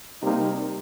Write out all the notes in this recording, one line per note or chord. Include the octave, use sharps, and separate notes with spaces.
C3 G3 A#3 D#4